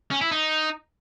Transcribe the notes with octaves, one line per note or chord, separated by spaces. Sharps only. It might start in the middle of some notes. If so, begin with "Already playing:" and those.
C#4
E4
D#4